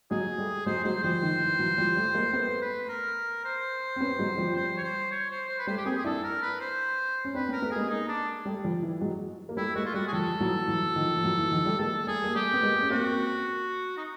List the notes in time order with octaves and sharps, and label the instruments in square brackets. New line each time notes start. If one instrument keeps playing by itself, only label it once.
[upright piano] F#3 G#3 [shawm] G#4
[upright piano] G3 A3
[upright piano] F#3 G#3 [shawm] C5
[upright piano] F#3 G#3 [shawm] C5
[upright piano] F3 G3 [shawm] C5
[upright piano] D#3 F3
E3
E3 F#3
F3 G3
G3 A3
G#3 A#3
[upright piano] A3 B3 [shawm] C5
[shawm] B4
A#4
C5
[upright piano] C4
B3 C#4
F#3 G#3
F3 G3
[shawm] C5
C#5
C5
C#5
C5
C5
B4
[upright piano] G3 A3 [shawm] C5
[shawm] G4
[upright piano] A#3 C4 [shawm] G#4
[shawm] G#4
[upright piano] D4 E4 [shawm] A4
[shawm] A#4
B4
C5
[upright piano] C#4
[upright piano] C4 D4 [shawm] B4
[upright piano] B3 C#4
[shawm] A#4
[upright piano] A3 B3
[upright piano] G#3 A#3 [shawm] G#4
[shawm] D#4
D4
[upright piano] G3 A3
F3 G3
E3
F#3 G#3
A#3
[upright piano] G3 A3 [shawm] E4
[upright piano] G#3 A#3 [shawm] F#4
[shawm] F4
[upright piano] G3 A3 [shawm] F#4
[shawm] G#4
[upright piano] F3 G3 [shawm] A4
[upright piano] E3 F#3
E3 F#3
D#3 F3
F3
E3 F#3
E3
D#3 F3
G3 A3
[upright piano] G#3 A#3 [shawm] A4
[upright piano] G3 A3 [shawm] G#4
[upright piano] A#3
[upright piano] G3 A3 [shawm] G4
[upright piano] B3
G#3 A#3
C#4
[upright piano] A#3 C4 [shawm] F#4
[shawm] D#4